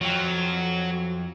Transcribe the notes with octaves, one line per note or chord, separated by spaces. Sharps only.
F2 F3 F#3 G5